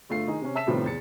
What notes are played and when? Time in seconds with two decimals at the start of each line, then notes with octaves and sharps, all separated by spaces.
0.09 G1 A3 F4 C7
0.27 D#3 D#4 G#4
0.41 C3 C#4
0.55 E5 A5 E6 B6 E7
0.67 A2 C3 D#3 F3 G3 B3
0.85 E2 A6 C#7